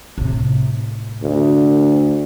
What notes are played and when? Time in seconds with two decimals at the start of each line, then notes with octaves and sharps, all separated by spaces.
0.18 A2 C3
1.23 D2